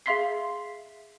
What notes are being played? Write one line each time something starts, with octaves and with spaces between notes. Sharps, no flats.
G#4 E5 F5 C6 B6 C7